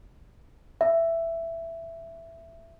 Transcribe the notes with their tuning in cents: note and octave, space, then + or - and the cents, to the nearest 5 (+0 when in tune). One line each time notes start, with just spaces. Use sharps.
E5 +10